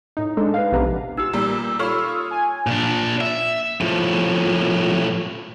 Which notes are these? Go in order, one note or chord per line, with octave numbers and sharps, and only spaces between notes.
A2 D#4
G#3 D4 A4
B4 F5
A#1 C3 B3 D4 B4 A#5
D#4 F4 G4 E6
A#2 G3
F4 A4 C#5 B5 F6
D#6 G#6
G#5
A#2 D4
E5
A2 F3